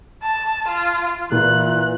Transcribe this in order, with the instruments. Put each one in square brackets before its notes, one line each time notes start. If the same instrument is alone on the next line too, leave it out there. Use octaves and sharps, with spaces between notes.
[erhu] A5
F4
[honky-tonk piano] A#2 [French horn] E3 [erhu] F#6